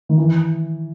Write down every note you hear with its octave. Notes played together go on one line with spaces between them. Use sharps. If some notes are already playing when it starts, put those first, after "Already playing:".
D#3
E3